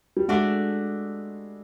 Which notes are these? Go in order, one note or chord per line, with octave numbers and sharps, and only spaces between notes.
G3
G#3 A3 D4 F#4